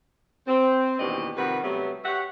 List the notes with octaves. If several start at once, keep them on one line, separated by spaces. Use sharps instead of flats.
C4
D#2 B2 E3 D4 G4 D#5
C3 D#3 F3 G3 F#4 B4
C3 F#3 G3 A3 B3
G4 C#5 E5 F#5